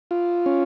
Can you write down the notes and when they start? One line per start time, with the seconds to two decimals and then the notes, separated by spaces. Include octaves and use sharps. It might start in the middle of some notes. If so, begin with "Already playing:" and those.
0.11 F4
0.46 C#4